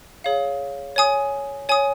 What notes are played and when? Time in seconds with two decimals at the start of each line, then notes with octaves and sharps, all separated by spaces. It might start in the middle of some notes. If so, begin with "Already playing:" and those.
0.24 G#4 C#5 F5
0.96 C#5 G#5 D#6
1.69 C#5 G#5 D#6